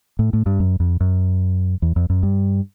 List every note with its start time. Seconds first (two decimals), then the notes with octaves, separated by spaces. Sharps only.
0.19 A2
0.33 A2
0.46 G2
0.60 F#2
0.80 F2
1.00 F#2
1.82 E2
1.96 F2
2.10 F#2
2.23 G2